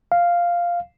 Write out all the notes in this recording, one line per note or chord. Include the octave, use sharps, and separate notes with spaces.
F5